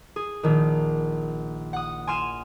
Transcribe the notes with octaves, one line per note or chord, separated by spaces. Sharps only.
G#4
A#1 D#3
F#5 D#6
G#5 C6 F6 D#7 E7